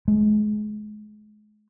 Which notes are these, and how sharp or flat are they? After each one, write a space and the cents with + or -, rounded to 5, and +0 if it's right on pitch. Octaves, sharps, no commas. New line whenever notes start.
G#3 +35